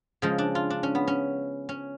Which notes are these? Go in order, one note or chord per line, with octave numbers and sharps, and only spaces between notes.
C#3 F3 G#3
D4
F4
D4
C#4
B3
C#4
C#4